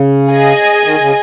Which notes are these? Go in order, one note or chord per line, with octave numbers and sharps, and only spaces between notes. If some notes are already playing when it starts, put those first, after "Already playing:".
Already playing: C#3
G#4 D#5 G#5
D#3
C#3